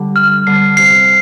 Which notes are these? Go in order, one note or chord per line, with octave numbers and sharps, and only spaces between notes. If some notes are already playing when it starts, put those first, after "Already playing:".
Already playing: D3 G3
F6
D3 G3 C7
C3 C7